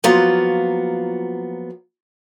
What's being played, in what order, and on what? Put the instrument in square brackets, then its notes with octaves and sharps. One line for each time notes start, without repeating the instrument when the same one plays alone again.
[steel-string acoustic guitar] F3 F#3 A#3 B3 F4